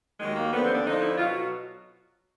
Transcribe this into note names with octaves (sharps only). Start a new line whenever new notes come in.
D#2 D#3 F#3 G#3
A#3
D#2 D3 F3 B3
C4
D4
F2 D3 F3 D#4
E4
B2 F#3 F4